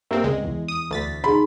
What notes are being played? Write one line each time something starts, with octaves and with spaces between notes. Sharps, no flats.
G2 A#3 C4 A#4 E5
C#2 G#3
E2
D#6
D2 A6 B6
D#4 G#4 B5 C6